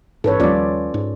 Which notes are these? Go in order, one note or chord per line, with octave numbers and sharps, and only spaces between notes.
A1 G#2 A4 B4 C#5
D#2 F3 G3 C#4 F4 D5
G#2